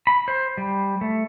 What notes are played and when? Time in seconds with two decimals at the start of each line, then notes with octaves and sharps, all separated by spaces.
0.07 B5
0.28 C5
0.58 G3
1.01 A3